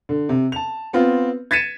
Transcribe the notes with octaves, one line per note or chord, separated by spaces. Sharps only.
D3
C3
A5 F7
B3 C4 F4
G#6 A6 B6 C#7 D#7 E7